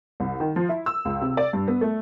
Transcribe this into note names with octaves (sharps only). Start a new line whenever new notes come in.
C2
D#3
F3
E4
E6
C#2
C3
D5
G2
B3
A3